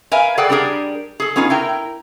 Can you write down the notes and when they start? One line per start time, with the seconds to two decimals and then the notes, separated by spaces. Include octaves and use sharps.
0.12 A#4 B4 E5 F5 G#5
0.37 G#4 A4 B4 D5 F#5 G5
0.50 G3 D4 G4 G#4 A#4
1.20 G#4 A4
1.36 B3 C#4 D#4 F4 G#4
1.50 E4 A#4 G5